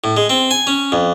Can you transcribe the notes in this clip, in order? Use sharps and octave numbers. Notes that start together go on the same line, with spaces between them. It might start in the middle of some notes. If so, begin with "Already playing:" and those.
A2
G#3
C4
G#5
C#4
F2